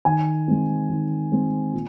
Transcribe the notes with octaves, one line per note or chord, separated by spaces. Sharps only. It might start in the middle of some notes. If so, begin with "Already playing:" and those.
D#3 G#5
G#3 C4
D#3
G#3 C4
A#2